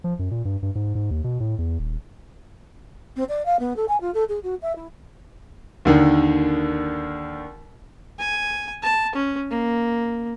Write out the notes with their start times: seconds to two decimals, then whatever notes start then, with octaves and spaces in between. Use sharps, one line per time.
0.04 F3
0.19 F#2
0.31 A#2
0.45 G2
0.63 G2
0.75 G#2
0.95 G#2
1.11 D#2
1.24 B2
1.40 A2
1.58 E2
1.79 D#1
3.16 C4
3.29 D5
3.46 F5
3.60 B3
3.76 A4
3.89 G#5
4.01 F4
4.14 A4
4.29 G#4
4.43 F#4
4.62 E5
4.76 E4
5.85 D#2 D3 D#3
8.19 G#5
8.82 A5
9.15 C#4
9.51 A#3